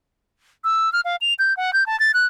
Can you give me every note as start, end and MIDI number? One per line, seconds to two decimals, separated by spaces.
0.64 0.92 88
0.93 1.01 89
1.05 1.16 77
1.21 1.34 101
1.39 1.56 91
1.57 1.73 78
1.73 1.86 91
1.86 1.98 81
2.00 2.12 93
2.14 2.26 90